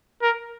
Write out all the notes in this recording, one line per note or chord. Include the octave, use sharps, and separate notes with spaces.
A#4